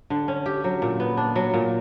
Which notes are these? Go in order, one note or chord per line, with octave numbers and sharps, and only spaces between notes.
D3
C#4
G4
F#3
A#2
B3
D4
F#3
A#2